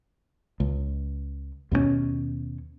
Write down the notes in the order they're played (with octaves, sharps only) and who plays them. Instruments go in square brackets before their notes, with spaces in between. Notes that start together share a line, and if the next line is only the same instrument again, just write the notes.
[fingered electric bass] C#2
D#2 B2 A#3 C#4